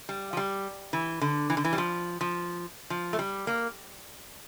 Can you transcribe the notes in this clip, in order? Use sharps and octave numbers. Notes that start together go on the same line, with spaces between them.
G3
F3
G3
E3
D3
E3
D3
E3
G3
F3
F3
F3
A3
G3
A#3